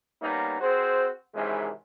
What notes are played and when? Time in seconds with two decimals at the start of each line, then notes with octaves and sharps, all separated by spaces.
0.22 G3 A#3 B3 C#4 D#4
0.61 C4 F#4 G#4 C5
1.34 G#1 C3 D#3 E3 G#3 C#4